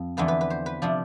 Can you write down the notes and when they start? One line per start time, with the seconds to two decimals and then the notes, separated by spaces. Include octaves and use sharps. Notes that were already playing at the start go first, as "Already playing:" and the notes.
Already playing: F2
0.17 E2 D3 F3 B4
0.28 B4
0.41 B4
0.50 C5
0.66 B4
0.82 C3 F3 D4